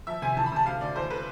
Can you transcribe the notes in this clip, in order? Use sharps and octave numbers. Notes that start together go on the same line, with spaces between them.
F3 E5
C3 G#5
E3 A5
B5
C3 A5
D2 F5
D2 D5
E2 C5
B4